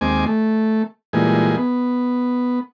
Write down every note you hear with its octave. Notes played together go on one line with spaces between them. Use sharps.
D#2 G#3 C4 G#5 D6
A3
A#2 E3 G3 G#3 G#4
B3